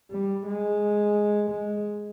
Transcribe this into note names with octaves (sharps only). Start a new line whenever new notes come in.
G3
G#3
G#3